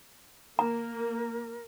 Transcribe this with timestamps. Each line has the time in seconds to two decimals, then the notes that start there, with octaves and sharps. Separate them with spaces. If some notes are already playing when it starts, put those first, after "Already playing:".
0.59 A#3 A#4 A#5